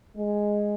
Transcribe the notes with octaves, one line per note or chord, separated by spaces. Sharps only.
G#3